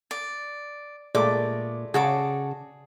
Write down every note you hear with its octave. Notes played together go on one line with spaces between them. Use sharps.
D5
A#2 G#3 A3 D5 D6
C#3 F#4 G#4 A4 D6